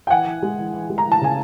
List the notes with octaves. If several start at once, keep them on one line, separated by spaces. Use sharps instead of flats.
G5
E3 F#5 G#5
E3
G#3
E3
E3
G#3
A#5
E3
A5
C#3 G#5